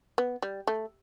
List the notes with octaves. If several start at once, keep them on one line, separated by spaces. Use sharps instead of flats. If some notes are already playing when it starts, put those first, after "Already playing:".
B3
G3
A3